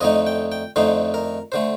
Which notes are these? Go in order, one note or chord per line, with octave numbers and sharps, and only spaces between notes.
F2 D3 A3 D#4 D#5
G5
G5
F2 D3 A3 D#4 C5
A#4
D3 A3 C5